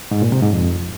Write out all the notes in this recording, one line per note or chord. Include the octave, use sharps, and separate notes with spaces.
G#2
A#2
C3
G#2
F2